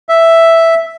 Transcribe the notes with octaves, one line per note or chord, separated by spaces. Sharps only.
E5